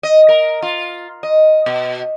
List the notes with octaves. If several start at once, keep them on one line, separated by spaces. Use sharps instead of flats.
D#5
A#4
F4
D#5
B2